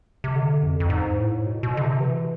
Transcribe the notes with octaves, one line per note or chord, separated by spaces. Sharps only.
C3
D3
F2
F2
G#2
A2
B2
B2
D3
C3
E3